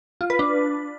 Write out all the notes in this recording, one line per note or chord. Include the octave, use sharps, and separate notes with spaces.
F4
B4
D4